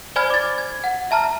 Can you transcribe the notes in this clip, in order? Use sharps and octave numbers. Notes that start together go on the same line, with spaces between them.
C5 D5 G#5 B5 F6 G#6
D6 A6
G#6
F#5
E5 A5 A#5 F6